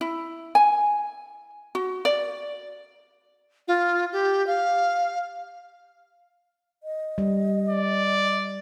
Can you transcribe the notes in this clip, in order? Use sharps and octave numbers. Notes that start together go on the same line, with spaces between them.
E4
G#5
F#4
D5
F4
G4
F5
D#5
G3
D5